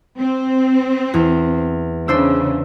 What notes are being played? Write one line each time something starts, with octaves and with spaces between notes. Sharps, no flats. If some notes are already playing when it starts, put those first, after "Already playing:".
C4
E2
C#3 D4 C5 E6